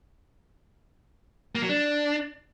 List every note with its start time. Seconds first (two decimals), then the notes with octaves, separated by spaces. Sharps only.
1.55 A#3
1.62 F#3
1.69 D4